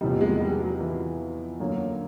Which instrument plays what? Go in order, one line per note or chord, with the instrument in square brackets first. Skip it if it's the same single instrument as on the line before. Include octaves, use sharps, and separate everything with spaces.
[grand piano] E2 C3 F3 A#3 D#4 [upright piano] G3
[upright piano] G#3
G3
F#3
E3
[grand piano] F#2 D3 F#3 A#3